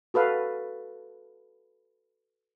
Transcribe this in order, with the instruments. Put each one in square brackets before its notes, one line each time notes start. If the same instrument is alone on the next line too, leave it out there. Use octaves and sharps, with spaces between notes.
[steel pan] F#4 A4 B4 F5